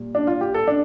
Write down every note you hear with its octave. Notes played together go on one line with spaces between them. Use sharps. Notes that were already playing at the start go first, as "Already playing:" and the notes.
Already playing: A#2 G3
D4
F4
G4
A4
D4